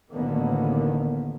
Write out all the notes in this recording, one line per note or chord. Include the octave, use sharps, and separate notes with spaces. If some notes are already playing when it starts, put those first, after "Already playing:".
A1 D2 D3 D#3 A#3 B3